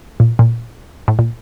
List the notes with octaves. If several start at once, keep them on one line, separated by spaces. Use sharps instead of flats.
A#2
A#2
A2
A#2